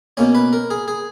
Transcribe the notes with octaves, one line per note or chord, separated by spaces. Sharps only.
B2 A#3 C#4 C#5
B4
A#4
G#4
G#4